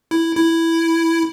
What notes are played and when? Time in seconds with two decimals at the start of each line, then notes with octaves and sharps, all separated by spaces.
0.11 E4
0.36 E4